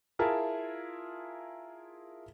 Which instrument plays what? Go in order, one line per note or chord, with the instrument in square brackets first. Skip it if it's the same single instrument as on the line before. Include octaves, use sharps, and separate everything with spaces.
[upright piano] E4 F4 G#4 A#4 E5 A5